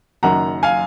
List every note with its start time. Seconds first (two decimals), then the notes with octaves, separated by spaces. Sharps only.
0.23 F#1 F#2 D#3 F#5 A#5
0.63 F5 G#5